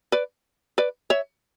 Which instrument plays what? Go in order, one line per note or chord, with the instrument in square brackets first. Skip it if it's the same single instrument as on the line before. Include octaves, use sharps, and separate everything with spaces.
[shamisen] B4 D5
B4 D5
C#5 E5